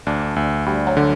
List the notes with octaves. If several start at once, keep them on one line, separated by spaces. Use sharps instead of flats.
D2 D4
D2
D2 G3
F#3
D3